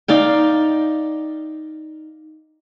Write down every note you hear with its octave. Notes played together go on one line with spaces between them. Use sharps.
D#4 D5 F5 G5